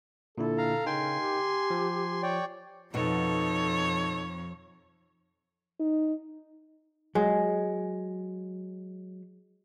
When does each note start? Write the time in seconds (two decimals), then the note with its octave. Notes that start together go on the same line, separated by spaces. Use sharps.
0.38 A#2 D3 E4 A4
0.58 F5 A#5
0.86 C#3 D#4 A#4 G5 G#5 C6
1.20 G4
1.70 F3
2.23 C#5 D5 G5
2.94 F2 B2 D#4 A4 C#5 F#5
5.80 D#4
7.15 F#3 G#3